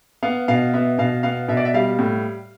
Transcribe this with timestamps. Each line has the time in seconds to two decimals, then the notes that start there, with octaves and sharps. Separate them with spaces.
0.23 B3 F5
0.48 B2 F5
0.74 B3 E5
0.98 B2 F5
1.23 B3 F5
1.48 B2 E5
1.57 D5
1.65 E5
1.74 G3 F5
1.99 A2